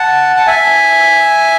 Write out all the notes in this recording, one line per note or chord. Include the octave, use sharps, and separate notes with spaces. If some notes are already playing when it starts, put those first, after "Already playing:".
Already playing: F#5 A5
A5
E5 G#5